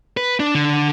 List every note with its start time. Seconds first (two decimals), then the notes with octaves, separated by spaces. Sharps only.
0.17 B4
0.40 D4
0.55 D3